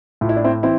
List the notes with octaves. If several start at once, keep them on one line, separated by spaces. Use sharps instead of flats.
A2 F4
E4
D4
C4 E4
E3 C4 E4